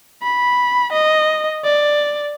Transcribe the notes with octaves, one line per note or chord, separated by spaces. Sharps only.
B5
D#5
D5